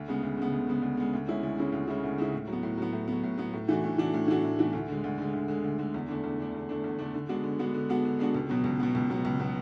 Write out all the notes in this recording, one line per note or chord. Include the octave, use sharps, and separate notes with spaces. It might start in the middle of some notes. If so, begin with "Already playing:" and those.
Already playing: D2
C#3 G#3 B3
D2
C#3 G#3 B3
D2
C#3 G#3 B3
D2
C#3 G#3 B3
D2
C#3 G#3 C#4 E4
D2
C#3 G#3 C#4 E4
D2
C#3 G#3 C#4 E4
D2
C#3 G#3 C#4 E4
A2
F#3
B3
A2
F#3 B3
A2
F#3 B3
A2
F#3 B3
A2
E3 A3 D4 F#4
A2
E3 A3 D4 F#4
A2
E3 A3 D4 F#4
A2
E3 A3 D4 F#4
D2
D3 G#3
D2
D3 G#3
D2
D3 G#3
D2
D3 G#3
E2
D3 A3 D4
E2
D3 A3 D4
E2
D3 A3 D4
E2
D3 A3 D4
D3
G#3 B3 D4 F#4
D3
G#3 B3 D4 F#4
D3
G#3 B3 D4 F#4
D3
G#3 B3 D4 F#4
C#2
B2 F#3 B3
C#2
B2 F#3 B3
C#2
B2 F#3 B3
C#2
B2 F#3 B3